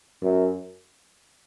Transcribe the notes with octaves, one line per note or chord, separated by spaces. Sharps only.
F#2